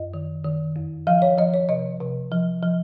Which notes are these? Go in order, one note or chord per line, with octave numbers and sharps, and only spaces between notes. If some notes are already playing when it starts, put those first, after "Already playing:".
Already playing: F#2 D#5
D#3
D#3
F2
F3 F5
C#5
F3 D#5
C#5
C3 D#5
C3
F3
F3